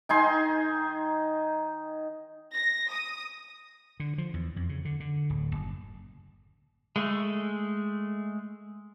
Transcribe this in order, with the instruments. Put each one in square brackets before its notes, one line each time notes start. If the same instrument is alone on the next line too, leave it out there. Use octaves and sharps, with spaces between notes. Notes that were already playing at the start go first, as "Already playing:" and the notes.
[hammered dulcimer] D#3 D#4 G#5 C6
[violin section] A#6
D#6
[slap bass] D3
F3
E2
F2
C#3
D3
D3
D1
F#1
[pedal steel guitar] G#3 A3